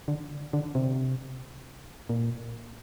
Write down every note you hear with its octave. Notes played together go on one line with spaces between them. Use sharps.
D3
D3
C3
A#2